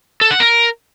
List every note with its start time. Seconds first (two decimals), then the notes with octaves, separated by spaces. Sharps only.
0.21 A4
0.31 F#5
0.40 A#4